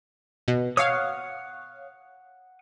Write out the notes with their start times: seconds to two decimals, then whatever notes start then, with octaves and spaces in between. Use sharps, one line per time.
0.48 B2
0.77 C#5 F5 F#5 D#6